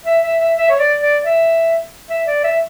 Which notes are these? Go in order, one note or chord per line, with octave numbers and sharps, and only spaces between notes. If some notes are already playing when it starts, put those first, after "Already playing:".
E5
E5
E5
E5
C#5
D5
D5
E5
E5
D5
E5